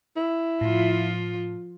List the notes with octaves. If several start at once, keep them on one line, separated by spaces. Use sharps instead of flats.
E4
A2 F3 F4